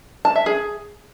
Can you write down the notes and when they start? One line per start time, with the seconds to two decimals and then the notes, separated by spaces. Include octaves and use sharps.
0.25 A5
0.36 E5
0.46 G#4